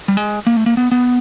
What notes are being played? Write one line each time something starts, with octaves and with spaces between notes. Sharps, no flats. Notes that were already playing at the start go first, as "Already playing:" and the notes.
G3
G#3
A#3
A3
A#3
B3
B3